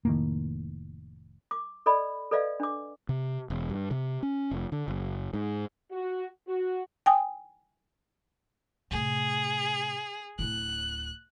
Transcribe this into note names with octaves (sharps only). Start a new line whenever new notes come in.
F1 A2 D#3 A#3
D6
A4 D5 D#5 B5
A4 B4 D5 D#5 F5
D4 D6
C3
E1
G2
C3
C#4
F1
D3
F#1
G#2
F#4
F#4
G5 G#5 D#6
A2 C3 G#4
D1 E4 F#6